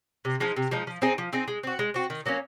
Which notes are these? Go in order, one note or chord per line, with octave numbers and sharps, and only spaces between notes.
C3
F3 G#3 D#4
C3
F3 G#3 D#4
F3
C4 D#4 G#4
F3
C4 D#4 G#4
G#3
C4 F#4
G#3
C4 F#4
D#3
F#3 A#3 C#4